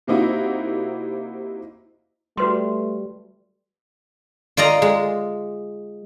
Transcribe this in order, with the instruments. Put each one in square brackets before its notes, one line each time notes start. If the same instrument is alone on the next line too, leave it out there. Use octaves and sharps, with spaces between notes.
[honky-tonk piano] C3 A#3 C4 D#4 E4 F#4
[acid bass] G3 [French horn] A3 [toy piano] F#4 B4 C6
[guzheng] F4 D5 D#5 A#5
G#3